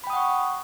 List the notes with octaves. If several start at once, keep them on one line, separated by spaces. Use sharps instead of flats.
F#5 G5 B5 C#6 D#6